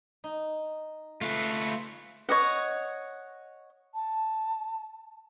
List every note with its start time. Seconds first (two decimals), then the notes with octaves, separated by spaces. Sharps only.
0.24 D#4
1.21 A3 F4 B4
2.29 C#5 D#5 F#5
3.94 A5